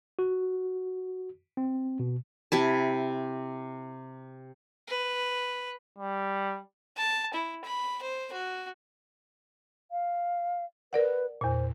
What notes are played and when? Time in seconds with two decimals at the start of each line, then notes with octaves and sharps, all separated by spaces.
0.19 F#4
1.57 C4
1.99 B2
2.52 C3 E4 A5
4.87 B4
5.98 G3
6.97 A5
7.33 E4
7.64 B5
8.02 C5
8.32 F#4
9.91 F5
10.93 A#4 B4 D5 F#5
11.41 E2 A#2 C5